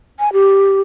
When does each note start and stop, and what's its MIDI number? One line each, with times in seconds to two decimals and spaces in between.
0.19 0.32 80
0.33 0.81 67